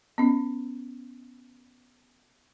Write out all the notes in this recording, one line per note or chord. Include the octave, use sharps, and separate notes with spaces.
B3 C#4